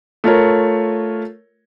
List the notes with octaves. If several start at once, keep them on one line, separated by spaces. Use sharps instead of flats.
A3 F4 A#4 C#5